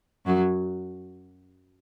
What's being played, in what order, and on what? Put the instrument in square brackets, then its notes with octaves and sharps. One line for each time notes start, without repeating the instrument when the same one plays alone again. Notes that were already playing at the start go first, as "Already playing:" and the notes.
[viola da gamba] F#2 F#3